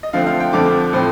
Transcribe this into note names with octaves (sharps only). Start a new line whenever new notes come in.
D#5
D3 F3 A3 C4 F5
F5
G5
F2 D3 F3 D6
A2 F3 C4